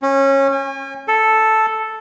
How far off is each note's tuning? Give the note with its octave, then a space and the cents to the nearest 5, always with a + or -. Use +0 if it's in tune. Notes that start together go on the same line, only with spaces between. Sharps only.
C#4 -20
G#5 -40
A4 +0